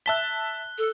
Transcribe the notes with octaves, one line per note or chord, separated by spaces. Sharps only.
E5 A5 F#6 B6 G7
A4